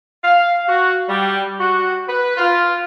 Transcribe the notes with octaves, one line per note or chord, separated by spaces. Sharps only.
F5
F#4
G3
F#4
B4
F4